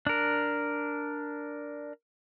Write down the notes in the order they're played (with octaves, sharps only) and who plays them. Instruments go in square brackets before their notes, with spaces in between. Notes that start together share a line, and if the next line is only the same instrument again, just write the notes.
[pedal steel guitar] D4 A#4